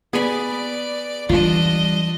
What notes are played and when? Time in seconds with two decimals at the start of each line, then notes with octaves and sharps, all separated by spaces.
0.13 B3 G#4 D5 G#5 B5
1.29 E3 G3 D4 F4 D#5